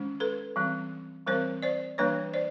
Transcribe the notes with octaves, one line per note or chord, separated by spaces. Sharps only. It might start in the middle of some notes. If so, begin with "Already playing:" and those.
Already playing: D#3 G#3 C#4
A4 B4
E3 G3 C4
E3 G3 C4 A#4 C5
C5 D5
E3 G3 A#3 D4 B4 C#5
C5 D5